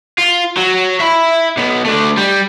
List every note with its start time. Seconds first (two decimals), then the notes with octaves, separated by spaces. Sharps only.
0.18 F4
0.57 F#3
1.00 E5 B5
1.57 B1 B3
1.85 A3 D4
2.17 G3